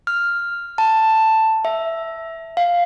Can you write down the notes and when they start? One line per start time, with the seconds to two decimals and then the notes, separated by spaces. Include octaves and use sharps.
0.07 F6
0.78 A5
1.65 E5
2.57 F5